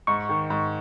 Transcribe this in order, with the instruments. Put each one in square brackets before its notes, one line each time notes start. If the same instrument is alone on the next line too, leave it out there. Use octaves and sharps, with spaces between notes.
[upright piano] G#2 [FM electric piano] C#6
[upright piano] D#3
G#2